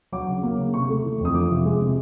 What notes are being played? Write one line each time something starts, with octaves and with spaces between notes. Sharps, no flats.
F#3 D6
C#3
A#3
C#3
C3 C#6
A3
E3
F2
D#6
F3 D6
C3
G#3
C3